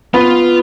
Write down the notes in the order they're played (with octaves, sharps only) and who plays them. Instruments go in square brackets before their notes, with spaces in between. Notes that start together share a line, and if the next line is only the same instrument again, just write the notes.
[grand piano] B3 [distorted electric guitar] F4